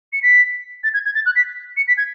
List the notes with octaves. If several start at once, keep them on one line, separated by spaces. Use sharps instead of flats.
C#7
B6
A6
G#6
G#6
A6
F#6
B6
C#7
B6
G#6